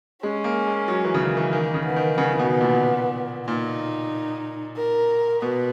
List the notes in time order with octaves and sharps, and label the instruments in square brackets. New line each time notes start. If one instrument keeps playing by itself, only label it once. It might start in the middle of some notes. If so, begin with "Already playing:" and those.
[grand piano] G#3 [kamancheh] C#4
[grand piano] A#3
G#3
F#3
E3
C#3
D#3
E3
[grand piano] D#3 [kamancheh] A#3
[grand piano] C#3
[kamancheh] B3
[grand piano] D#3
[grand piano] C#3 [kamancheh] B3
[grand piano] C#3
B2
A#2
[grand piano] A#2 [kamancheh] D#4
[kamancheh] A#4
[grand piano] B2 [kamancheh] B4